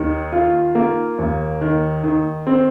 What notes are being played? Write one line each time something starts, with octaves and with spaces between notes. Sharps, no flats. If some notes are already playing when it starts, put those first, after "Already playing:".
Already playing: D#2 D#3
F4
A#3
D#2
D#3
D#3
C4